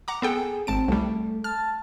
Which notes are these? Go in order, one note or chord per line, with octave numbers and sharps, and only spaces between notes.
F#5 A#5 D6
B3 G#4 A4 G5
G#1 C4 A5 D7
C2 G3 A3
A5 F6